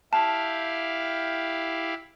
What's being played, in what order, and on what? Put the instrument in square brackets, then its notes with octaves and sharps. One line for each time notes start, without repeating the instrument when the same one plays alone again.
[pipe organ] E4 G4 F5 [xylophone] A5